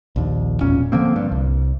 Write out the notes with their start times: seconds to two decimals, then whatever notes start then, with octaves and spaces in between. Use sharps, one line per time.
0.16 A#1 D#2
0.61 E1 A#2 C#4
0.92 D3 F3 A#3 C4
1.16 G2
1.31 C2